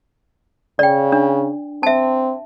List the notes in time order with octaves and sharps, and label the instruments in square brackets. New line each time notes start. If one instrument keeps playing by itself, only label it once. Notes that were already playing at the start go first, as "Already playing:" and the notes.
[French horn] C#3 [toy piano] D5 G5
[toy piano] D4
[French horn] C4 [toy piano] E5 A5